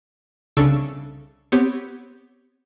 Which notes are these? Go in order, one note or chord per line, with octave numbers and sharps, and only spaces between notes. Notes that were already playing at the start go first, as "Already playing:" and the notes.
C2 C#3 D4 A4 C#6 E6
B3 C4 G4 C#5